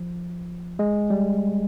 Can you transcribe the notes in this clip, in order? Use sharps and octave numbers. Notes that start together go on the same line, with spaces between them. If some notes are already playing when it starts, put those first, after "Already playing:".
Already playing: F3
G#3
G3